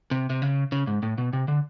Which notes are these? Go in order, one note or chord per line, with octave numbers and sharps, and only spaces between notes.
C3
C3
C#3
C#3
G#2
A2
B2
C3
D3